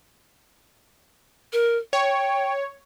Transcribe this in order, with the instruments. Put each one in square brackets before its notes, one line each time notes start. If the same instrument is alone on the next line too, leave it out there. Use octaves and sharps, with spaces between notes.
[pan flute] A#4
[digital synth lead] C#5 [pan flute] G5